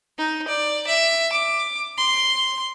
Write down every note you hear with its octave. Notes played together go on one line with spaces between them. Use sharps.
D#4
D5
E5
D6
C6